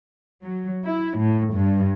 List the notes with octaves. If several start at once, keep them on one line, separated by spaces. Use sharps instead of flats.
F#3
E4
A2
G2